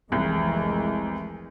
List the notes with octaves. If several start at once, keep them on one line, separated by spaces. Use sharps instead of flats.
F1 C2 E3 G#3